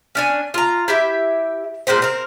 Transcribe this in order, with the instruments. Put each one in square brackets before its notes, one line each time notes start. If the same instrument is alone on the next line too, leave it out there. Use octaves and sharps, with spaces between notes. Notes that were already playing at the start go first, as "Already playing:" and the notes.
[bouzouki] C#4 D4 G#5
F4 A#5
E4 G4 E5
A#2 G#3 G4 C5
C4 A#4